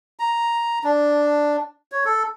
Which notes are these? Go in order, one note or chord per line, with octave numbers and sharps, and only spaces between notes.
A#5
D4
C#5
A4